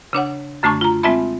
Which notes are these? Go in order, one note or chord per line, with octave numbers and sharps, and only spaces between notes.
C#3 D4 C#5 F#5
F#2 D3 A3 D4 A5 C#6
F4 A#5
G#3 C4 F4 E5 A5 B5